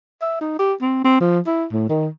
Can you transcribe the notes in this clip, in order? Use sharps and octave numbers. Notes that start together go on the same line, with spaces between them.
E5
D#4
G4
C4
C4
F3
E4
A2
D#3